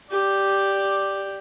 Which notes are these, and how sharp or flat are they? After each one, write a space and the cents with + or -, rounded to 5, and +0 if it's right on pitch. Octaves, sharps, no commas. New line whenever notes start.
G4 +0 D5 +0